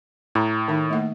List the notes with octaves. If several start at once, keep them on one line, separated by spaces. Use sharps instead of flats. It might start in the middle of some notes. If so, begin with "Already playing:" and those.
A2 A#5 B5
D#3 D#4 E5
A3 A#3 F#5